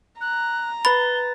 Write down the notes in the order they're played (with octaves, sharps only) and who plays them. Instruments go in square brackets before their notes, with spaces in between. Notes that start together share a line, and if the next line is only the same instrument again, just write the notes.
[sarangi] A#5 [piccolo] F#6
[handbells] B4 A6 [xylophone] B5 [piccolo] G7